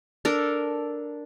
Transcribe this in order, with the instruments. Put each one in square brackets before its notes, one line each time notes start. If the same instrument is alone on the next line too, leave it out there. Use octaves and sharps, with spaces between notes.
[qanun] D4 A4 A#4